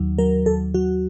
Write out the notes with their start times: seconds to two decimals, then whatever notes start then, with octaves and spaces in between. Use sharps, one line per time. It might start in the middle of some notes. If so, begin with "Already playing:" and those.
Already playing: D#2 F#3
0.18 F#3 A#4
0.46 D#2 A4
0.74 F#3 F#4